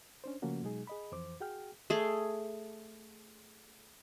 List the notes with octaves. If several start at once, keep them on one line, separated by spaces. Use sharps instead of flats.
C#4 D4 C5
C#3 F3 A3 A#3 C#4 F#4
B2 F#3 G#3 D#4 G#4
G#4 D#5 B5
F2 E3 C5 D6
F#4 G#4 G5 F6
A3 G#4